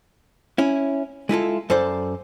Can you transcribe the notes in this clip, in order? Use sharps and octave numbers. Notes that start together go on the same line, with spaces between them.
C#4 E4
G#3 E4 F4 A4
F#2 A4 C5 D5